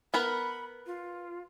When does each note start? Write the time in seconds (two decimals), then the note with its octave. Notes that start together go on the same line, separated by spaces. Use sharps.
0.14 B3 A#4 B4 B5
0.86 F4